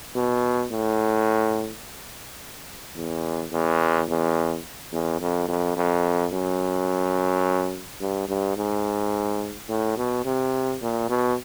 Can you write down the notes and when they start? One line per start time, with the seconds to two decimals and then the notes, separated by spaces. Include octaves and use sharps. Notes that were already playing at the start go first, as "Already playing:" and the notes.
0.15 B2
0.72 A2
2.95 E2
3.52 E2
4.08 E2
4.92 E2
5.20 F2
5.48 F2
5.76 F2
6.32 F#2
8.01 G2
8.28 G2
8.57 G#2
9.69 A2
9.97 B2
10.25 C3
10.81 A#2
11.09 B2